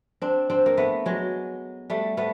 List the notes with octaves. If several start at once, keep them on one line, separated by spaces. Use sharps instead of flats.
C4 D4
C4 D4
A#3
A3 B3
F#3 G#3
G3 A3
A3 B3